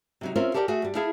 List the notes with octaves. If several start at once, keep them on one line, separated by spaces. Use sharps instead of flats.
C3 F#3 D#4
C4 C#4 F4 A#4 C5 E5
G4 A4 A#4 D5 G5
A3 F#4 G#4 E5
G2 G3
E4 G#4 A4 E5 F5